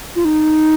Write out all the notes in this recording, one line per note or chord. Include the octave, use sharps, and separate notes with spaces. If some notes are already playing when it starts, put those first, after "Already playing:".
F4
D#4